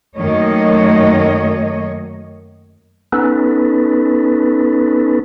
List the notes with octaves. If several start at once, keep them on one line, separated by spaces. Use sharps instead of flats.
F#2 D#3 A3 A#3 C#5 D#5
B3 C#4 D#4 A4 B4